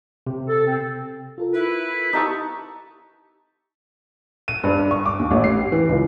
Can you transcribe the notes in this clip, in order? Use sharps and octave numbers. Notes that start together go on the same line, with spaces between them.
C3
A4
C4
F4 A4 A#4
E4 B4
D#4 G4 E5 A5 C#6
D#7
G2
D4
C#6
D6
D#2
A1
C7
G4
E3
C#2